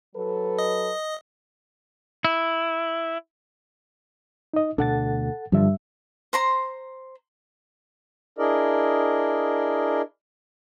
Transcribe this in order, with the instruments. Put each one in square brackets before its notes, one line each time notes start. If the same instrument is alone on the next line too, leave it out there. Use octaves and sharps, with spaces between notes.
[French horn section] F#3 A4 B4
[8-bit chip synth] D#5
[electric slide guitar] E4
[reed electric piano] D#4 D#5
[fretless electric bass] D2 B2 D4 [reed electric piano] A4 F#5 A6
[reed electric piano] G2 G3 E5 [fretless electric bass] D3 F3
[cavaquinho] C5 A#5 C6
[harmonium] D4 E4 G#4 A#4 D5 D#5